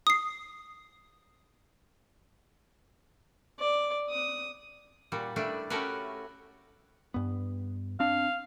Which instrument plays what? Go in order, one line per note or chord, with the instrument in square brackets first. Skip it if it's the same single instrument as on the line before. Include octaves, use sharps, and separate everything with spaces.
[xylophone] D#6 C7
[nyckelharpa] D5
D#6
[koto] A#2 G3 F#4
G3 A3 D4 E4
A3 C#4 F#4 G4 A#4 B4
[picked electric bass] G2 B3
[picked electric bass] C4 D4 [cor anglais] F5